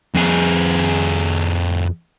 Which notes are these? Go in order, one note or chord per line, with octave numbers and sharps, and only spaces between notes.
F2 G#4